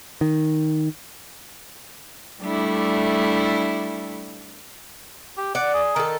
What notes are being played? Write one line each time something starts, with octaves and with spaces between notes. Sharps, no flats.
D#3
G3 A3 D4 E4
G4
D5 F#5
G#4
D#3 A4